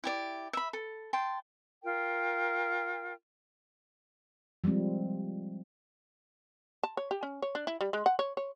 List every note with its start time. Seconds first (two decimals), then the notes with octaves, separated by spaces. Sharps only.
0.04 E4 G4 D5
0.53 E5 B5
0.73 A4
1.13 G5 A5 C6
1.83 F4 A#4 G5
4.64 F3 G3 G#3 C4
6.83 A5
6.97 C#5
7.11 G4
7.23 C#4
7.42 C#5
7.55 D4
7.67 E4
7.81 G3
7.93 G#3
8.06 F#5
8.19 C#5
8.37 C#5